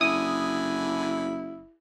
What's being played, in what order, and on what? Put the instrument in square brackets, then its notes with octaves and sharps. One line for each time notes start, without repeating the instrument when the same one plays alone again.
[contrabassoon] F#1 [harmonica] D3 G#5 B5 [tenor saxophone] E4 [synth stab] D#6